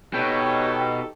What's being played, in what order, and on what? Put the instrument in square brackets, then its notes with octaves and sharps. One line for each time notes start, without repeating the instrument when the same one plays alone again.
[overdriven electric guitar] B2 [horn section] D#4 G4 A4 [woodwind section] C#5 [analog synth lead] G5